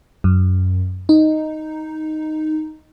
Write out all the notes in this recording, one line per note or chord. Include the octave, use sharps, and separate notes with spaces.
F#2
D#4